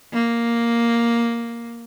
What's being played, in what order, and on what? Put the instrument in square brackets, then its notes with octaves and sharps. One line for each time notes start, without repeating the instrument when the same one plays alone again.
[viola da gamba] A#3